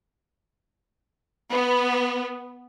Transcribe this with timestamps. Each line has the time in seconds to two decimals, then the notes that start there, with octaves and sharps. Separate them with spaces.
1.50 B3